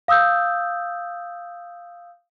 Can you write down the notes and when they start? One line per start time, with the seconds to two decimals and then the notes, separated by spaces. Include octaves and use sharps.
0.08 F5 D#6 E6 G6